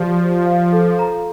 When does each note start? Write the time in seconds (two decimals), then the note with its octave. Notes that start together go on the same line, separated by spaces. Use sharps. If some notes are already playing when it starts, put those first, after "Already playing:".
Already playing: F3 G4 D5
0.19 G4
0.46 F5
0.72 A4
0.99 A#5